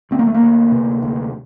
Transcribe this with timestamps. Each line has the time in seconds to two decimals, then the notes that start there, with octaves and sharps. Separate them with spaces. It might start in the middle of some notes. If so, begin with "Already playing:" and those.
0.11 D2 C4
0.19 A#3
0.27 A3
0.34 A#3
0.42 D2
0.72 C3
1.03 D2